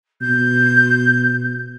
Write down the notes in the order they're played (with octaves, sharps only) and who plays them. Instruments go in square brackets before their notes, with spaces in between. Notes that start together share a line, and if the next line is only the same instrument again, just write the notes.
[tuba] B2 [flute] G6